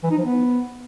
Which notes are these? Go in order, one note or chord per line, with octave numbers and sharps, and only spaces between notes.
E3
D#4
F3
B3